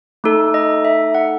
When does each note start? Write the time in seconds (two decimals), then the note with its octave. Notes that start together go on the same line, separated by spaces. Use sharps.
0.24 A3 D#4 A4
0.54 D#5
0.85 E5
1.15 F#5